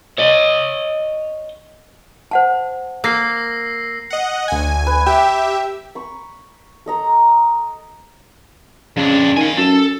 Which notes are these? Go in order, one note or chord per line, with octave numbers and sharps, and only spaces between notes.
C#5 D#5
C5 F#5 A5
A#3 E6 A#6 C7
D#5 F#5
D2 G#5
B4
G4 E5 G5
B5 C#6
A4 D#5 A#5
F2 C#3 D4
D#3 F5 G#5
F#2 A4